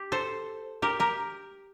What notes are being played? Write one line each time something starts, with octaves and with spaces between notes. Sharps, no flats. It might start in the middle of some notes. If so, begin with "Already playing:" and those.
Already playing: G4
A4 C5
G4 A#4
G4 A#4